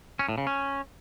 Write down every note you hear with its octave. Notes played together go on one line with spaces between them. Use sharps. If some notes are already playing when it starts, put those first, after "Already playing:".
C#4
A2
C#3
C#4